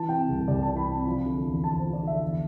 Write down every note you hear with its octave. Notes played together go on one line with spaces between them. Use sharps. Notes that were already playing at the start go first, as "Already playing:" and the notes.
Already playing: E3 A5
C3 G5
C2
C2 D5
E3 A5
B5
C3 A5
F3 B5
D3
E2
E2 A5
C5
F3
D5
D3 E5
E2